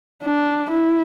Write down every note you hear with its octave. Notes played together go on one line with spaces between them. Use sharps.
D4
E4